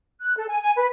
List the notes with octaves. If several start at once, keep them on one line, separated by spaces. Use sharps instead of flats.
F#6
A4
G#5
G#5
B4